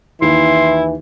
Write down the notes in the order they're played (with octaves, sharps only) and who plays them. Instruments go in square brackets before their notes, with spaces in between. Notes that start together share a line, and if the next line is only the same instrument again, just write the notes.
[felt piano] D#2 [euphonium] E3 [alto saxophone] E4 [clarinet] C6